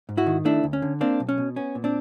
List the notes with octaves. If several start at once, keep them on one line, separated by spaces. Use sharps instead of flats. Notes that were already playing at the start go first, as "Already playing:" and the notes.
G#2
E4 F#4
D#3
A3 D4 E4
D2
C#4
D3
A#3 C4 D4
B1
C#4
B2
B3 C#4
A#2
C4 D4